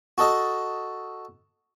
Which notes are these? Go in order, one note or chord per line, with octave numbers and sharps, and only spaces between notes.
F#4 A4 D#5 A5